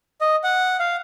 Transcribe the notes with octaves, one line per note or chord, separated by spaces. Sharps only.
D#5
F#5
F5